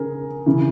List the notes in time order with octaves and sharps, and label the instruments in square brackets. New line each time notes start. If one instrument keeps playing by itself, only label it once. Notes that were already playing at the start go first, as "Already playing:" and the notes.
Already playing: [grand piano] C#3 G#4 A#4
C#3 E3